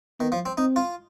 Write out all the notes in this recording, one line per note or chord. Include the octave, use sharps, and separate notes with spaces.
D#3 B3
F3
C4
C4 D#4
F4